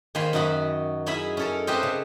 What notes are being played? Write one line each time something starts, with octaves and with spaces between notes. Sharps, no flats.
D#3 A#3 C5 G#5 B5 C6
F#2 F#3 D#4 F#4 B5
C#4 D#4 E4 G#4 E5 B5
C#4 A4 A#4
A3 C4 G4 B4 C5 D#5
C#3